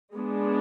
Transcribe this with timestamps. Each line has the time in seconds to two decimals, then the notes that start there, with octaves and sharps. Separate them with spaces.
0.14 G#3 B3 D4